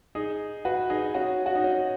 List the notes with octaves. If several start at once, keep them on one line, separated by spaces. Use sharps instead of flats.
D#4 G#4
F#4 B4
D#4 G#4
C#4 F#4
F#4
D#4
C#4